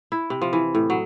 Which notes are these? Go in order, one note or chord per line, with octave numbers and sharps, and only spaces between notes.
E4
C3
F3
E3
A2
F#3